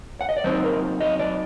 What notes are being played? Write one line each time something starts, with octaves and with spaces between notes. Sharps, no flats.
F#5
D#5
D5
F#3 C4 D#4 C5
A#4
D#5
D5